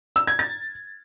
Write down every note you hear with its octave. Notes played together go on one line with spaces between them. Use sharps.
E6
G#6
A6